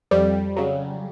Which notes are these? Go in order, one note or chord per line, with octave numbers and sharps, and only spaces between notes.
F2 G3
C#3 F#3